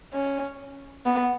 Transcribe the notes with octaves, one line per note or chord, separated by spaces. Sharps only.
C#4
B3